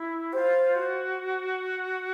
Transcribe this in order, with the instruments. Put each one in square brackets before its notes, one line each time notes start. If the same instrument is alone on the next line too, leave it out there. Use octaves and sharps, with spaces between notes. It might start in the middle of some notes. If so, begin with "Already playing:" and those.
Already playing: [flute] E4
[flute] G4 [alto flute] C5
[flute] F4
F#4